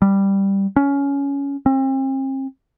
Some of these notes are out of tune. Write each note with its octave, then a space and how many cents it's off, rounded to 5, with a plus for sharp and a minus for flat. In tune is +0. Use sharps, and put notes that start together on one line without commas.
G3 +0
C#4 +15
C4 +40